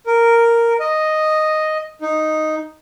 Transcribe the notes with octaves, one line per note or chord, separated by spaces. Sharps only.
A#4
D#5
D#4